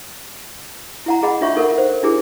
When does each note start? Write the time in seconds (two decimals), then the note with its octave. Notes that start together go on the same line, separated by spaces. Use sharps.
1.06 E4 F#5 A#5
1.23 G#4 D#5 F#5 B5
1.41 D4 F4 C#5 E5 C#6
1.55 D#4 A4 A#4 F#5
1.75 C5 F#5
2.03 D4 E4 G4 G#4 A#4